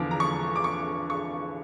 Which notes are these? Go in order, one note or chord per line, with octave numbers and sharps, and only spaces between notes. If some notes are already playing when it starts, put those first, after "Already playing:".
Already playing: E2 D3 F3 D6
A#5
C#6
D6
C#6
C#6